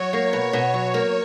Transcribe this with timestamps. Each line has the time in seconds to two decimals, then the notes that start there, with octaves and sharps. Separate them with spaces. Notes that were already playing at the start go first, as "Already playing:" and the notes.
Already playing: F#3 C#5
0.13 A#3
0.33 B2
0.53 B2
0.74 F#3
0.94 A#3